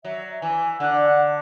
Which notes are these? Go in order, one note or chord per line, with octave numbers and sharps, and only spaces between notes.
F#3 E5
E3 G#5
D3 F#5
F#5